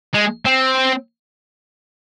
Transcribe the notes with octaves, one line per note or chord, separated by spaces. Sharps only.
G#3
C4